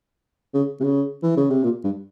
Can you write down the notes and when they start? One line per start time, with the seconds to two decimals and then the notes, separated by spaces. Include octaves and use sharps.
0.54 C#3
0.80 C3
0.84 C#3
1.23 E3
1.37 C#3
1.50 C3
1.63 A#2
1.84 G2